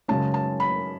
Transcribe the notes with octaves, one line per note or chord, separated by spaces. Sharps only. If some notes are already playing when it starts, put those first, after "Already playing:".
F#2 C#3 G#3 C#4 A5
A5
B5